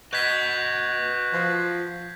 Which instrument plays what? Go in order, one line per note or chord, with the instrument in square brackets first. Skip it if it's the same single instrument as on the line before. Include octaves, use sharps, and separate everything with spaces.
[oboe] F#4 [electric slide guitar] B4 D#5 [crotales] G6 G#6 B6
[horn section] F3